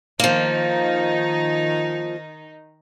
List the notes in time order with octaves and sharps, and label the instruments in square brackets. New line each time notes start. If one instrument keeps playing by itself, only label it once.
[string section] D#3 D#4 [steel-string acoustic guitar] F3 A#3